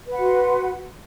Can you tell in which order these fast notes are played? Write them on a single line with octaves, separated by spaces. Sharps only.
B4 F#5 F#4 C6